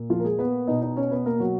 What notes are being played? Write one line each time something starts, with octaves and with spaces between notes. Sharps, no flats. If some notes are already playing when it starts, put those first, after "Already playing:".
Already playing: A#2
F3 F4
A#4
G#3 G#4
B3 B4
B2 D#4 D#5
D#4 D#5
C#4 C#5
B3 B4
A#3 A#4
F#3 F#4